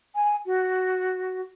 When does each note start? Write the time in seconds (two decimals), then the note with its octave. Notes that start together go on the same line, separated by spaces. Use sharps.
0.15 G#5
0.45 F#4